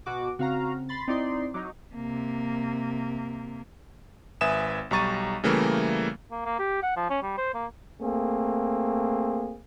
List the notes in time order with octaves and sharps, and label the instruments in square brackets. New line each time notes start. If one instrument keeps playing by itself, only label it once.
[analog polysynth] B2 F#4 D6
[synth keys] C#3 C4 [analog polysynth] F#4 F5 A#5
[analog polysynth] B5 C6 A6
[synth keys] C4 E4 [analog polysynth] D#4 D5 C6
[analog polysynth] F#3 D#4 [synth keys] D6
[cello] C3 A#3
[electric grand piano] G#1 B4 E5 G#5 D#6 E7
B1 G3 A#5 C#6 A6 D#7
C#3 E3 G3 A3 A#3
[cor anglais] A#3
A#3
G4
F#5
F3
C#4
G3
C5
A#3
[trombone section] A3 A#3 C4 G#4